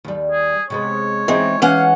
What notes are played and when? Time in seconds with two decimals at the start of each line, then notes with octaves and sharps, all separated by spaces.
0.05 D#2 G3
0.32 G#4
0.70 C3 G#3 B3 C#5
1.28 E3 G#3 C4 D#4
1.62 E3 C#4 F5 F#5